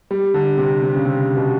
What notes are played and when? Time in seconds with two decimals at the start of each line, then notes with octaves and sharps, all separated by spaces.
0.11 G3
0.34 D3
0.58 C3
0.82 C3
0.95 C#3
1.05 C3
1.36 B2